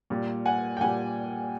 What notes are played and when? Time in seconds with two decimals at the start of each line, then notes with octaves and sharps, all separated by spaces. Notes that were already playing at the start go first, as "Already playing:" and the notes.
0.10 A#2 G3
0.46 F#5 G#5
0.77 G5
0.81 A#2 G3 F#5 G#5